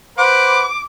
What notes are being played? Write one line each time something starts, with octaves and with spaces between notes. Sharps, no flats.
B4 C5 F#5 D6